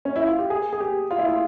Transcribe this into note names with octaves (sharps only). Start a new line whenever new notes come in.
C#4
E4
F4
G4
G#4
G#4
G4
F4
E4
F4